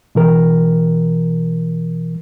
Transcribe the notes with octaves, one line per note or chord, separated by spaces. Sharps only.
B2 E3 A#4